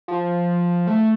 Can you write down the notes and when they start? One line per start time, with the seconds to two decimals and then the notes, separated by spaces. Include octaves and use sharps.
0.08 F3
0.87 A3